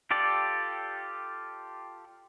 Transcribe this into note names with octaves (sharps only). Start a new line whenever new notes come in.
F4 G4 A4 D5